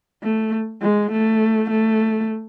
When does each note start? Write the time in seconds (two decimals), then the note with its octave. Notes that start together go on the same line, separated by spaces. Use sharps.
0.23 A3
0.82 G#3
1.12 A3
1.70 A3